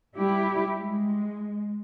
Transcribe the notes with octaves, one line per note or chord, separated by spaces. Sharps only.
G3 E4 G4
G#3